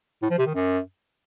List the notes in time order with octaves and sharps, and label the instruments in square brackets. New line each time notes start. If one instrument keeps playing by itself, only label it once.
[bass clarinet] A2
F3
C3
D#3
F#2